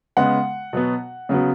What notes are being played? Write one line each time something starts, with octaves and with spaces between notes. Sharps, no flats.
C#3 G#3 B3 F#5
B2 F#3 B3
C#3 F#3 B3